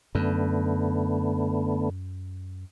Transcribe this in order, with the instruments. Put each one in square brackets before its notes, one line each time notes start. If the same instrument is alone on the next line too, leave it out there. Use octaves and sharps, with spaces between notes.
[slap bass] F#2 [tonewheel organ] D3 A3 B3